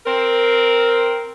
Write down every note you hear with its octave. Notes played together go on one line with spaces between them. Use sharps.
C4 A#4